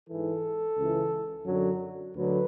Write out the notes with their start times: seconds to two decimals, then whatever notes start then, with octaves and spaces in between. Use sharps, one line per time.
0.08 G#2 E3 A4
0.78 C#2 C#3 E3
1.45 F#2 D3 F#3
2.15 D2 D3 F#3 B4